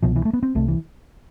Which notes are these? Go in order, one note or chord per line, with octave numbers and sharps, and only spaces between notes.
C2 B2 F3
E3
A3
B3
C4
C2 C3 A3
E3